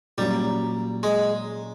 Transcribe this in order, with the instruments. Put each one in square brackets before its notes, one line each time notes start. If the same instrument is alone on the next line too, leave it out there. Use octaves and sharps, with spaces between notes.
[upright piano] A#2 F#3 A#3 C#4 [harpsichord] G3
[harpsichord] G#3